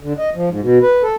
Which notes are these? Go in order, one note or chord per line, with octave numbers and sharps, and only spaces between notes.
D3
D#5
F3
G#2
B2
B4
A4